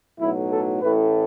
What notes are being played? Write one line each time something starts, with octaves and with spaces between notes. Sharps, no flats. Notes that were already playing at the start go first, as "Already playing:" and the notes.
B1 A2 F#3 E4
A4
A1 A2 A3 B4